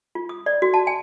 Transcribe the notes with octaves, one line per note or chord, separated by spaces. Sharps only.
F4
D#6
D5
F#4
A5
G#5